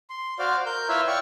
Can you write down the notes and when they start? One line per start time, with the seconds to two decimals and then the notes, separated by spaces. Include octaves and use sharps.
0.10 C6
0.39 F#4 C5 D5 F5
0.66 A#4 G6
0.89 E4 F4 B4 C#5 E5 F5
1.07 D5 F5 G5 C#6